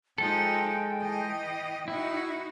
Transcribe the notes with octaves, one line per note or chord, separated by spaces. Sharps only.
F3 G#3 D#4 A4 G5
E3 D#5
D#4 E4 F#4